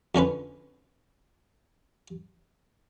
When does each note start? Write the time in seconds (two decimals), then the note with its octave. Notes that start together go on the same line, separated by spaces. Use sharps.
0.15 F2 D3 C#4 B4